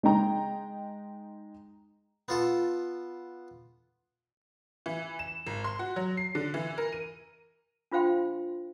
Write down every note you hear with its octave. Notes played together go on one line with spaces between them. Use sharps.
G#3 D#4 G5 A#5
B3 F4 A4
E3
E7
G#1
C6
F#4
F#3
C7
D3
E3
A#4
D#7
D4 F4 C5 F5 G5 C6